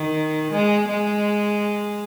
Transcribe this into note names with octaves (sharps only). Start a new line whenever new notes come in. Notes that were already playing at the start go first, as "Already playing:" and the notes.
Already playing: D#3
G#3
G#3